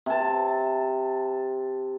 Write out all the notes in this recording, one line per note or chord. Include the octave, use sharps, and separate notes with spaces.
C3 A5